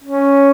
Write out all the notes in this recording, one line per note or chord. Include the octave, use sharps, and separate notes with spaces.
C#4